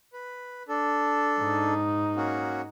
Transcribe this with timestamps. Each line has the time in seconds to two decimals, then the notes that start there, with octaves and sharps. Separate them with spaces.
0.13 B4
0.68 D4 A4
1.39 G#2 D#4
2.16 A#3 C#4 F#4